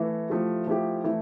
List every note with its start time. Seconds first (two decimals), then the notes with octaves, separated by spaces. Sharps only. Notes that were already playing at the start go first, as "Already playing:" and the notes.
Already playing: E3 A3 E4 B4 E5
0.30 F3 A3 E4 G4
0.67 F3 A3 E4 G4
1.04 E3 A3 E4